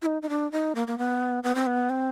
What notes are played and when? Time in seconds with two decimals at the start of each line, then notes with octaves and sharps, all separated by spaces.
0.02 E4
0.06 D#4
0.22 D#4
0.29 D4
0.52 D#4
0.75 A#3
0.87 A#3
0.98 B3
1.43 B3
1.55 C4
1.67 B3
1.90 C4